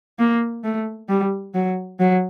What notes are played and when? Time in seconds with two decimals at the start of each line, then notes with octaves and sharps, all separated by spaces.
0.19 A#3
0.64 A3
1.09 G3
1.54 F#3
2.00 F#3